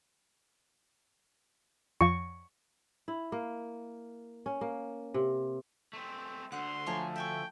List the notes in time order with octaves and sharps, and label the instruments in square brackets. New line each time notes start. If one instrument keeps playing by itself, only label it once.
[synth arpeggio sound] F2 F3 [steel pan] C#6
[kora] E4
A#3
C#4
A#3
C3
[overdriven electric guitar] A3 C4
[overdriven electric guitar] D2 D3 [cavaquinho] C5 F#5 [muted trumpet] C6
[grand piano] F3 A3 [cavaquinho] C#5 G#5 A#5
[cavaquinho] E5 G#5 C#6 [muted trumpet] G5